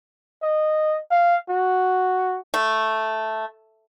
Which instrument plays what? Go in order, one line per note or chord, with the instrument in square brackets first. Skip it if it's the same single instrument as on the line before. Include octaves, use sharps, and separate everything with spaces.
[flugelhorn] D#5
F5
F#4
[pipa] A3